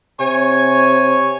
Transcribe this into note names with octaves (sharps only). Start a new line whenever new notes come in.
C3 C#5 G#5